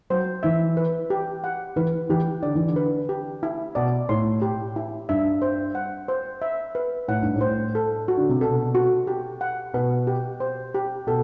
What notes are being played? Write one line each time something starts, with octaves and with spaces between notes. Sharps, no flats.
F#3 C5
E3 E5
B4
G4
F#5
E3 B4
E3 G4
D3 D5
E3
D3
B4
G4
E4
B2 D5
A2 C6
G4
E4
G2 E5
C5
F#5
C5
E5
B4
A2 F#5
G2
A2
C5
A4
F#4
D3
C3
B2 A4
F#4
G4
F#5
B2 B4
G4
C5
G4
B2 A4